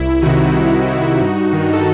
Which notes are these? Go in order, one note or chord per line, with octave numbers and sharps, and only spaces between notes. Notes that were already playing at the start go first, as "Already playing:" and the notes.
Already playing: C2 E4
C3 D#3 D#4 F#4
C2
C3 D#3
G2
D#3
A4